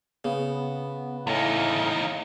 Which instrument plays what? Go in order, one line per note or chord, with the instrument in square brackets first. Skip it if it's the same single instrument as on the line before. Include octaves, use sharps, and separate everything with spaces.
[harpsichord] C#3 [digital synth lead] B3
[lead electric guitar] E2 D#4 [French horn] A2 [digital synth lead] F5